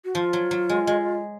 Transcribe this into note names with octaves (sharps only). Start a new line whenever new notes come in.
F#4
F3 F4
F#3
F#3
G#3
G#3